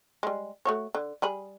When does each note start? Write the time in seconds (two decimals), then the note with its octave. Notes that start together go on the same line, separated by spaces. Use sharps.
0.23 G3 G#3
0.65 A3 F#4 C#5
0.95 D3
1.22 G3 G#4 B5